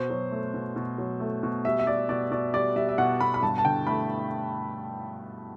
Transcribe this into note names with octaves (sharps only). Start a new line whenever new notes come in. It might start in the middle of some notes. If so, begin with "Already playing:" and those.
Already playing: B2 C5
F#3
A3
B2
B2
F#3
A3
B2
G3 E5
E5
G3 D5
B2 D5
B2 D5
G3 D5
G3 E5
E5
B2 F#5
B2 B5
B5
G2 A5
A5
D3 G5
A3 B5